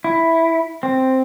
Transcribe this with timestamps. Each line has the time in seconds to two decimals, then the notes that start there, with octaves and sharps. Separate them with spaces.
0.04 E4
0.83 C4